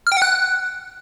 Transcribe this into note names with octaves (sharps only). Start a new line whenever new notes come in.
F6
G5
F#5
F#6